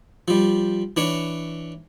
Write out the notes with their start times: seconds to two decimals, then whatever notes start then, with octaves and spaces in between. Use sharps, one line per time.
0.28 F3 G3
0.97 E3 D4 C#5